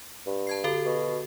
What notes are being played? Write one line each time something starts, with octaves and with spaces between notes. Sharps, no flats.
G2
A5 G#6 C7
D3 F#4 A4
B2